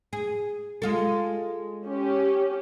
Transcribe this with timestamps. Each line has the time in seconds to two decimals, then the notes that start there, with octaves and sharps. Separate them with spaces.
0.13 G#4
0.82 G#3 F4 A4
1.85 C#4 G4